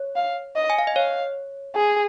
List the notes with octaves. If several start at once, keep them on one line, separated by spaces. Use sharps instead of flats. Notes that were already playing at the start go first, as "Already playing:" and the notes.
Already playing: C#5
F5
D#5
G#5
F5
D#5
C#5 F5
G#4